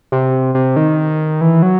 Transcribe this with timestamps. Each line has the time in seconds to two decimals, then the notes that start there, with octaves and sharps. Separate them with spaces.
0.12 C3
0.55 C3
0.76 D#3
1.41 E3
1.62 F#3